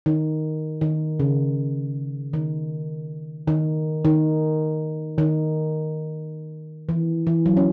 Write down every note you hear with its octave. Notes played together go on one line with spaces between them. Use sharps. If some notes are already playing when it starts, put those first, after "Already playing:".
D#3
D#3
C#3
D#3
D#3
D#3
D#3
E3
E3
F#3
C#4